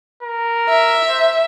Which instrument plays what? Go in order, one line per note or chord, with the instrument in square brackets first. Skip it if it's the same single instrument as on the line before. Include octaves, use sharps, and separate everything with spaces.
[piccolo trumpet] A#4
[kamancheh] E5
[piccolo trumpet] C5